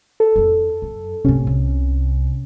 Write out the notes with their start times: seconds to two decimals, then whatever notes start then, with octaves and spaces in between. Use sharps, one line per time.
0.20 A4
0.36 F2 E3
0.82 F#2
1.25 G1 A2 C3 C#4
1.47 C2